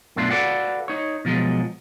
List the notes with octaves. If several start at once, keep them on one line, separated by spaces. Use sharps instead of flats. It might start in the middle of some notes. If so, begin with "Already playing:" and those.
F#2 B2 A3 D4 F4
F#4 A4 B4 D5 F5 F#5
D#4 C#5
B2 F3 F#3 G#3